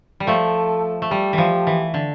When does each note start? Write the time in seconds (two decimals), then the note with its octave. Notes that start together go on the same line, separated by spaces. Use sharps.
0.20 G3
0.27 F3 A3 A4
1.02 A3
1.11 G3 G4
1.33 E3 F3
1.67 E3
1.94 D3